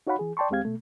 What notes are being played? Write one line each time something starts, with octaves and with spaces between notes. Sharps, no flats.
D#4 F#4 C#5 F5 F#5 B5
E3 G#4
D5 G5 A5 C6 C#6
D#2 G#3 C4 G4 F5 G#6
B2 A3